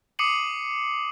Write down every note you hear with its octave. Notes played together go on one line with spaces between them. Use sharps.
D6 D#6 C7 C#7 D#7 F#7